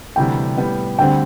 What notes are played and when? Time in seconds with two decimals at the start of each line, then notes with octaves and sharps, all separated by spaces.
0.16 D2 C3 E3 G3 G5
0.57 A2 G3 B3
0.99 D2 D3 G3 C4 G5